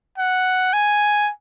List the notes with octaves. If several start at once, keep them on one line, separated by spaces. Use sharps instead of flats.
F#5
G#5